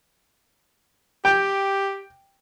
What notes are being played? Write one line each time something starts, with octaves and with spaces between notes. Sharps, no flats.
G4 G5